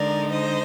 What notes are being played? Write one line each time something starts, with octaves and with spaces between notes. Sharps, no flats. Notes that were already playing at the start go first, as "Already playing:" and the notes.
Already playing: D3 G#3 D#4 A#4 D5
C5 D#5